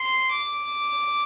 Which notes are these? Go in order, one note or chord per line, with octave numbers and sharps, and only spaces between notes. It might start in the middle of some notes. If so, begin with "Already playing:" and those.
Already playing: C6
D6